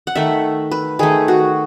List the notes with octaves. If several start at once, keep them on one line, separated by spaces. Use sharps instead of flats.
F#5
D#3 A3 E5
B4
D#3 A3 G#4
F#4